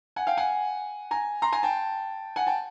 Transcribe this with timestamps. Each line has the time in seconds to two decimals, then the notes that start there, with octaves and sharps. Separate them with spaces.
0.16 F#5 G#5
0.27 F5 G5
0.37 F#5 G#5
1.11 G#5 A#5
1.42 A#5 C6
1.52 G#5 A#5
1.63 G5 A5
2.36 F#5 G#5
2.47 G5 A5